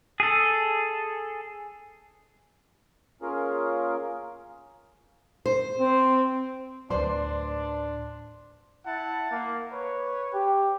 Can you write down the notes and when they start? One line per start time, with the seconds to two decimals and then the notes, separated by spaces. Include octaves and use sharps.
0.20 G#4 A4
3.22 A#3 C#4 F4 G#4 A#4
5.46 C5
5.78 C4
6.90 D2 A2 D4 B4 C5 D5 C6
8.86 E4 F#5 A5
9.32 A#3
9.73 B4 C#5
10.34 G4